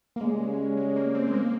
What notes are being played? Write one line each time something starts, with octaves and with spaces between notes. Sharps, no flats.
A#3
C#3 G3 G#3 C#4
G#3
A#3
C4
G#3
A#3